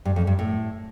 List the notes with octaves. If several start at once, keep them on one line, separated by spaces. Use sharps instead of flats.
G2
F2
G2
A2